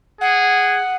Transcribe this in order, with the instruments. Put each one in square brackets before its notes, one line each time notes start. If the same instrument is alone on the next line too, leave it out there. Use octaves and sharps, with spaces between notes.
[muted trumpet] G#4 [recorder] F#5